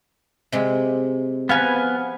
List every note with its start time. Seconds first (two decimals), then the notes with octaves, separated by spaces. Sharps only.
0.52 C3 G#3
1.49 F3 B3 B4 F5 G#5